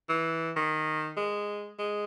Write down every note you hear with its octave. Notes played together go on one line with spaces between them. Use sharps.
E3
D#3
G#3
G#3